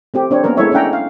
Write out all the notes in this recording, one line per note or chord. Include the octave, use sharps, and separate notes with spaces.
A3 C4 G4
C4 D4 C#5
A#3 B3 C#4 A#4
G#3 E4 A4 A#4 C#5 E5
C#4 D4 E5 F#5 G5 A#5
F5